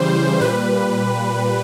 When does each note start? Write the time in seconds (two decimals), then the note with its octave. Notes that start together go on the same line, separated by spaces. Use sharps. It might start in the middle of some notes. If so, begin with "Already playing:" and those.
Already playing: C#3 E3 G3 C5
0.40 A#2 G3 B4